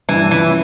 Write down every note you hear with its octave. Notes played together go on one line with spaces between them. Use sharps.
G2 E3
E3 F3 C#4